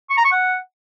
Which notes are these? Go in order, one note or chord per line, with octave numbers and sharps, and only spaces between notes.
C#6
A#5
C#6
F#5